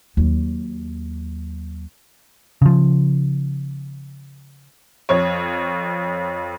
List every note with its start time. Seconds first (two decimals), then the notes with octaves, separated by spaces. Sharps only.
0.17 D#2 F#3
2.62 C#3 F3
5.09 F2 C#5